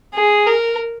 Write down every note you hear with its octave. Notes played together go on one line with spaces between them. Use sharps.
G#4
A#4